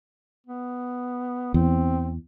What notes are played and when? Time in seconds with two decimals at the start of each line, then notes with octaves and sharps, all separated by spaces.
0.47 B3
1.54 E2 C4